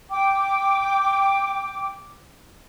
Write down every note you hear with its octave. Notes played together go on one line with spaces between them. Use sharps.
G5 D6